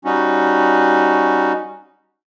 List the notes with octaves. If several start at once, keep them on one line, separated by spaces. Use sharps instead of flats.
G3 C#4 D#4 F#4